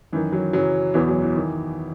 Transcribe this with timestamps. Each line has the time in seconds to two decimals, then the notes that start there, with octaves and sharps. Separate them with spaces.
0.13 F#2 D#3 E3
0.32 F#3
0.53 F#2 C#3 E3 F#3
0.94 E2 B2 E3
1.07 F#3
1.22 E3
1.36 D#3